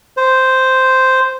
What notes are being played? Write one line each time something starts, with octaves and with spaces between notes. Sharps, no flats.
C5